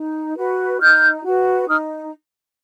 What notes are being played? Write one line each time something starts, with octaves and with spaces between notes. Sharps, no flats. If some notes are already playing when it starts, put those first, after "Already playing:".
Already playing: D#4
F#4 B4
D#4 F6 G6
F#4 B4
D#4 D#6 F6